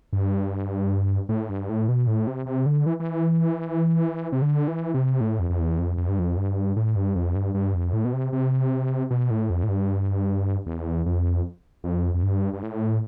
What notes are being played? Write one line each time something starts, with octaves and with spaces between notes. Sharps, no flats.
G2
A2
G2
A2
B2
A2
C3
C3
D3
E3
E3
C3
D3
E3
C3
A2
F2
F2
E2
F2
F2
G2
F2
G2
A2
G2
F2
G2
G2
F2
A2
B2
C3
C3
B2
A2
F2
A2
G2
E2
F2
F2
F2
G2
G2
A2